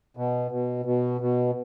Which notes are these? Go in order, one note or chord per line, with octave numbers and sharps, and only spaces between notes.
B2
B2
B2
B2